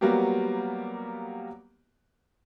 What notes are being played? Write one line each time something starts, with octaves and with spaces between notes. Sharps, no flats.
F#3 G3 A#3 B3 F#4 G4